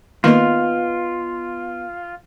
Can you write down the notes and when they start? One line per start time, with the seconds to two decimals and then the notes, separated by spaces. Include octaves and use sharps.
0.24 D#3 A#3 B3 F4 D#5